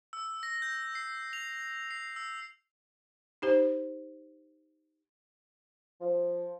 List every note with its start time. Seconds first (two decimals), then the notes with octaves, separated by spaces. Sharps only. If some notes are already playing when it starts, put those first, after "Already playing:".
0.13 E6
0.43 A#6
0.62 G6
0.95 C7
1.33 F7
1.91 C7
2.16 E6
3.42 D#4 G4 C5
6.00 F3